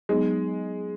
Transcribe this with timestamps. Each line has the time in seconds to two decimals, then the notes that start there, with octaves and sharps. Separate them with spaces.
0.09 F#3 G#3 B3 D#4